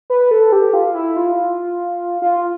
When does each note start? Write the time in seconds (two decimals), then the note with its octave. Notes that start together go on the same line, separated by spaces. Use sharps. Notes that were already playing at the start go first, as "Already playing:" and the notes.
0.10 B4
0.31 A4
0.52 G4
0.73 F4
0.95 E4
1.16 F4
2.22 F4